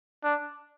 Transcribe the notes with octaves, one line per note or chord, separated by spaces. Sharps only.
D4